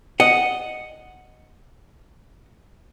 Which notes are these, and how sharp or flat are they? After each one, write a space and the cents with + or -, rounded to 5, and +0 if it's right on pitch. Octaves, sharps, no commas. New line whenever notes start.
D#5 +0 F#5 +0